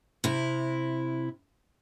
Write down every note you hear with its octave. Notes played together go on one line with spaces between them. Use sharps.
C3 E4